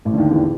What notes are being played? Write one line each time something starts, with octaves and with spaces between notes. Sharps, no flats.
A1 A2
D3
D#2 D#3
E2 E3